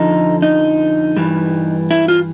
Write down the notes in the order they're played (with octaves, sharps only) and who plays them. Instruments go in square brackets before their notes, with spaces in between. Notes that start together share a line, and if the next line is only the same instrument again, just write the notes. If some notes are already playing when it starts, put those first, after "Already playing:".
Already playing: [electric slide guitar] F2 D3 F3 D#4
D#4
G2 E3 G3
E4
F4